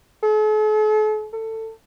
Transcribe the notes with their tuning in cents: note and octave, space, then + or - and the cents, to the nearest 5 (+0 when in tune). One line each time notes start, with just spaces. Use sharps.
A4 -45
A4 +20